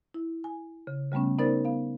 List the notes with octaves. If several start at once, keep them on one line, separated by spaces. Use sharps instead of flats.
E4
G#5
C#3
C#3 G3 A3 B3 C#4
B3 D#4 A#4 C5 D5 A6
B3 F5